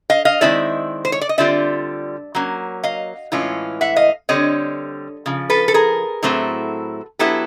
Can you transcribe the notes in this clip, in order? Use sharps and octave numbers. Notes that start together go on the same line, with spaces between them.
D#5 F5
D#5 F5
D#3 G#3 C4 E4 D5 E5
C5
C#5
D5
D#5
D3 G3 C4 F4 D5 E5
F#3 A#3 C#4
D#5 F5
A2 E3 G#3 C#4 F4
E5 F#5
D#5 F5
D3 G3 C4 C#5 D#5
C#3 F3
A4 B4
A4
G#4 A#4
A2 F#3 A3 C4 E4
F#3 B3 E4 G4 A4